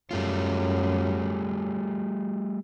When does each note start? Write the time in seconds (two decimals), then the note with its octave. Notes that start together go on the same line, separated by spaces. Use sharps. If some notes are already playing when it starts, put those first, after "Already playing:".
0.11 F#2 G3 A3 F4